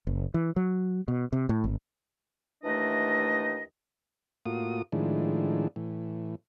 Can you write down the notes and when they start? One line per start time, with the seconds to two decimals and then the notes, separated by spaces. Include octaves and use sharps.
0.07 F#1
0.34 E3
0.56 F#3
1.08 B2
1.33 C3
1.49 A2
1.64 G#1
2.63 D#2 E3 A3 D4 D#5
4.46 A2 A#3 F4 F#4 D#6
4.92 A2 D#3 F3 G#3 D4 E4
5.76 A2 E3